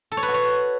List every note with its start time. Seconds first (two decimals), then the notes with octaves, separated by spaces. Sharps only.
0.12 A4
0.17 C#5
0.23 B4
0.28 F#4
0.34 C#5